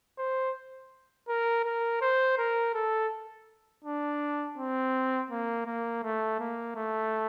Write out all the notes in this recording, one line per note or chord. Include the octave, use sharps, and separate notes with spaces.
C5
A#4
A#4
C5
A#4
A4
D4
C4
A#3
A#3
A3
A#3
A3